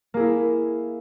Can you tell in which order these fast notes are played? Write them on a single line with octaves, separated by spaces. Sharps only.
A#3 G#4 E4